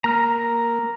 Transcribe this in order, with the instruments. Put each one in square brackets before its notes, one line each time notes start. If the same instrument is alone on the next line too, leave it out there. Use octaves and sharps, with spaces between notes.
[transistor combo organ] A#3 [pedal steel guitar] A#5 F6